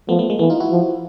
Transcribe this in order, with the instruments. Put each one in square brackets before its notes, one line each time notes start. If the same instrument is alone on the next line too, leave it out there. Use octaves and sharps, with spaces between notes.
[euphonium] F3 [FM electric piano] A3 B3
[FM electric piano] A3 B3
G#3 A#3
[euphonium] E3 [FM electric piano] A3 B3
[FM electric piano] D#4 F4
E4 F#4
[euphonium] F3